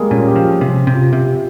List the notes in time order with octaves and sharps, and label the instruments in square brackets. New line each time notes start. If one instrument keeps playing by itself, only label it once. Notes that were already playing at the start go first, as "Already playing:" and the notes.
Already playing: [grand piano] G3 G#3 A#3
[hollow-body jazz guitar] A#2 [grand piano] C#4
[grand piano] G4
[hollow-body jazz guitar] F3
[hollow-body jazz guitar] C3 [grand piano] C#4
[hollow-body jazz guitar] C3
[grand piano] F4
[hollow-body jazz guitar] C3 [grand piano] G4